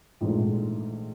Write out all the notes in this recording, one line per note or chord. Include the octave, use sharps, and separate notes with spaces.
A#1 G#2 E3 A3